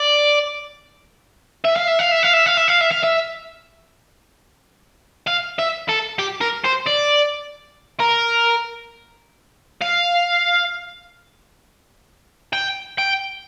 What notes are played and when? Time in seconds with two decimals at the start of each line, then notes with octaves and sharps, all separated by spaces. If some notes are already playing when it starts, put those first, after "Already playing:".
Already playing: D5
1.64 E5
1.76 F5
1.88 E5
1.99 F5
2.11 E5
2.23 F5
2.33 E5
2.46 F5
2.57 E5
2.68 F5
2.81 E5
2.91 F5
3.03 E5
5.27 F5
5.59 E5
5.89 A4
6.19 G4
6.41 A#4
6.64 C5
6.86 D5
8.00 A#4
9.81 F5
12.53 G5
12.98 G5